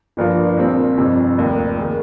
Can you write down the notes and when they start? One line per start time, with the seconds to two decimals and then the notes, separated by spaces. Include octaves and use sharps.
0.17 G1 G2 F3 A#3 F4
0.57 A#1 A#2 G3 C4
0.97 G1 F2 C3
1.37 F1 D#2 D#3
1.78 D#3 G#3